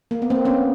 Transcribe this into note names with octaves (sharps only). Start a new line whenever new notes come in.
A#3
B3
A#3 C4
B3 C#4